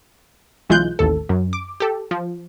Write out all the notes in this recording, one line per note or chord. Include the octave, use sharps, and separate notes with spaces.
B1 E3 G#3 F4 F#6 G6
A1 D#2 A4
F#2
D6
G4 A4
F3